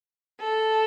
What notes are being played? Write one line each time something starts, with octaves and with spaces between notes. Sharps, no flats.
A4